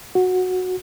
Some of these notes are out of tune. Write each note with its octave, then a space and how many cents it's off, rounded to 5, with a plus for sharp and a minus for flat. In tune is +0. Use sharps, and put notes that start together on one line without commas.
F#4 -10